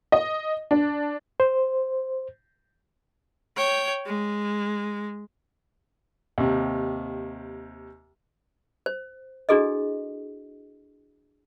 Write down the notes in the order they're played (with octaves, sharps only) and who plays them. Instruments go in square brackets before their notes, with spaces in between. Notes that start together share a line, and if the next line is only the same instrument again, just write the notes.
[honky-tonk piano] D#5
D4
[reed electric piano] C5
[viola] C#5 G5
G#3
[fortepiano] D#2 C3
[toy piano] C5
D4 E4 F#4 G#4 A4 D#5